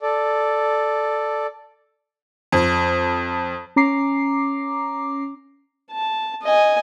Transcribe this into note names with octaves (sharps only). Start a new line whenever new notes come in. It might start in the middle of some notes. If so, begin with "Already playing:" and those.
A4 D5
F2
C#4 A#5 D6 C7
A5
D#5 G#5